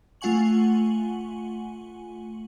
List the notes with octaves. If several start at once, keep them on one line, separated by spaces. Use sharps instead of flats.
A3 F4 F#5 G#5 C#6 F#7